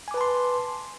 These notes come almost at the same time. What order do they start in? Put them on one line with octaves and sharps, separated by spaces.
G#5 D6 B4 A5 C6